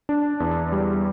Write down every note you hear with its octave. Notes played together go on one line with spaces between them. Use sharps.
D4
E2
G3